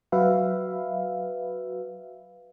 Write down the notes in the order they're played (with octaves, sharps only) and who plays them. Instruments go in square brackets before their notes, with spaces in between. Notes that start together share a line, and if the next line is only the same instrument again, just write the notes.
[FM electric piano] F#3 F#4 B4 E5 F5